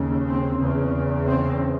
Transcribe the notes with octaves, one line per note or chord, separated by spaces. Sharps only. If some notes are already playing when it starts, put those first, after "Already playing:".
Already playing: D#2 C#3
C4
E2 C#3
C4